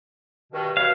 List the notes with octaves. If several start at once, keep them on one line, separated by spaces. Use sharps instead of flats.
G2 B2 D#3
B2 B4 C#5 F5